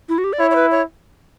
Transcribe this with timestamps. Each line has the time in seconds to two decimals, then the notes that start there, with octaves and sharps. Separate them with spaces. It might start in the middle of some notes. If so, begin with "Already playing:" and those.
0.09 E4
0.18 F#4
0.24 G4
0.33 D5
0.40 E4 C#5
0.51 C#5
0.55 B4
0.71 C#5